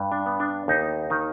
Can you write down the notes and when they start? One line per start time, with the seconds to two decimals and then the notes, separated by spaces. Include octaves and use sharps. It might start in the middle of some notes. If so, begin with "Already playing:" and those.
Already playing: G2
0.12 D4
0.26 B3
0.40 D4
0.68 D#2 D#4
1.10 D#3 D#4